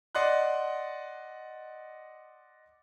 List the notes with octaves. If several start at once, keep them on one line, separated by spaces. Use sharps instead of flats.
D5 D#5 F#5 C6 F#6